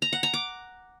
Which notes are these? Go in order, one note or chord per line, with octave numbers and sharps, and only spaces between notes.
A#5
F#5
A#5
D6